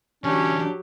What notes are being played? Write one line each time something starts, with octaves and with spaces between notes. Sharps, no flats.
D3 E3 F#3 C#4 D4 G4